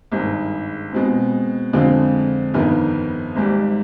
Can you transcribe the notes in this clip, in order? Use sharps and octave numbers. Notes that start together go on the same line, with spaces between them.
G#1 G2 D#3 G#3
B2 G#3 C4
F2 D3 G#3 C4 F4
G1 F2 D#3 B3
G#1 G#2 G3